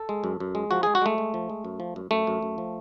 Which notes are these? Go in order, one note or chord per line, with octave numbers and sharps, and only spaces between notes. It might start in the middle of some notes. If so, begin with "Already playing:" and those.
Already playing: A4
G#3
F#2
F#2
G#3
F3 F#4
G#3 G#4
F#4
G#3 A3
G#3
F3
G#3
F#2
F3
F#2
F#2 A3
F#2
F#2
F3